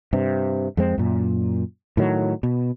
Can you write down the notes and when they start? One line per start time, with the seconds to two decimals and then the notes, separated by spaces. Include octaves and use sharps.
0.13 G2 C3
0.77 F2 G#3 C4
0.98 F#2 A#2
1.97 A2 D#3 F#3
2.43 B2